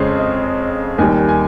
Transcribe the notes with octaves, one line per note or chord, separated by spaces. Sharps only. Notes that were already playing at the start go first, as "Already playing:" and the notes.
Already playing: F2 C#3 G#3 C5 C#5
D#5
D#2 D#3 G3 G#5
G5
G#5
G#5